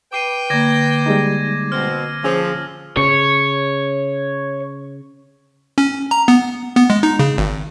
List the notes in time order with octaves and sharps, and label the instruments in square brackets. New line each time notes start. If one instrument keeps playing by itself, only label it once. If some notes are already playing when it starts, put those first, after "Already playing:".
[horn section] B4 G5 [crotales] D6 C7 D#7
[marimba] D3 A#3 [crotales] D6 G#6 A#6
[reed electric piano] G3 G#3 D#4
[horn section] B2 B3 C4 [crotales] F6
[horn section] F3 [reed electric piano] C#4 G#4 C5 [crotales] E6
[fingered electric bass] C#3 [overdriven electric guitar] C#5
[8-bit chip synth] C#4
A#5
B3
B3
G#3
D#4
C#3
G#1